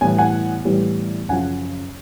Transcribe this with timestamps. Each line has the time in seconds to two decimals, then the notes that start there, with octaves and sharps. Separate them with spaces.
0.01 A2 E3 G3 B3 G#5
0.18 F#5 G#5
0.65 A2 E3 G3 B3
1.29 F#2 C#3 F3 F#5 G#5